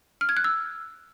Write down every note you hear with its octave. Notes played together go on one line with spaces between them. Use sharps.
F6
G#6
F#6
E6